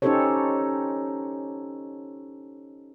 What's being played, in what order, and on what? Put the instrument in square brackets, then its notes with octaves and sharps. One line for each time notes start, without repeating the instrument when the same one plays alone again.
[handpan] C#4 D#4 G4 A4 C5 C#5